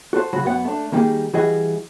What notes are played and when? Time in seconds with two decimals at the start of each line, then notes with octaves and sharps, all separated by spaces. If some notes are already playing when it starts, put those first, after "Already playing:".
0.13 F#4 A4 B4 C5
0.33 C#3 F#3 F#4 B5
0.45 F#2 B3 F#5
0.65 A3 D4
0.92 D#3 G3 A#3 D#4 G4 G#4
1.33 E3 G3 E4 F#4 G#4 D#5